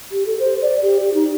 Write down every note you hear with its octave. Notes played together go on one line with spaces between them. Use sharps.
G4
A4
C5
D5
G4
G4
D#4